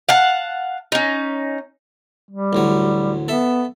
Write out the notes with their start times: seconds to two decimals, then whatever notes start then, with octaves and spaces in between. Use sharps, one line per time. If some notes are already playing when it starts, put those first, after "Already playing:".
0.09 F5 F#5 A5
0.92 C#4 D#4
2.31 G3
2.53 A1 D2 F#3
3.28 B3 A4 E5